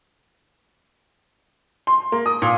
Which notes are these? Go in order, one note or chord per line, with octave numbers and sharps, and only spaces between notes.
C6
A#3
D#6
A#2